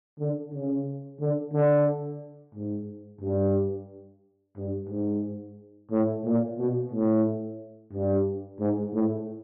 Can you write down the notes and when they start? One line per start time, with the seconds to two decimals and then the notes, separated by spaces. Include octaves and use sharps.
0.19 D3
0.52 C#3
1.20 D3
1.53 D3
2.55 G#2
3.21 G2
4.57 G2
4.89 G#2
5.91 A2
6.25 A#2
6.58 B2
6.92 A2
7.93 G2
8.60 G#2
8.94 A2